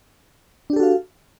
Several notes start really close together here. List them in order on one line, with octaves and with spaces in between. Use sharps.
D4 G4 A4 F#4 F5